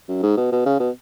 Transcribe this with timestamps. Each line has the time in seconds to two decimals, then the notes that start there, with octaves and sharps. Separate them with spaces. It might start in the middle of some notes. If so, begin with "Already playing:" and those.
0.09 F#2
0.23 G#2
0.37 B2
0.52 B2
0.66 C#3
0.80 B2